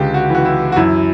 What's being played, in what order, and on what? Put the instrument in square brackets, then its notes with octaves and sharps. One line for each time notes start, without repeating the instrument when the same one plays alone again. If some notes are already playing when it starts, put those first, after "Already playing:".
Already playing: [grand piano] C#2 D3 G4
F#4
E3 F#4
E4
F#4
F#2 E4